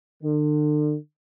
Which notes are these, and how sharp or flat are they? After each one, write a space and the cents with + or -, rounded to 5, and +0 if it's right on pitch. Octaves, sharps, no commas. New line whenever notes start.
D3 +40